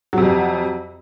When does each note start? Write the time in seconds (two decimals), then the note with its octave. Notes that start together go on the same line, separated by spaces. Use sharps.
0.13 F#3
0.18 C3
0.22 F2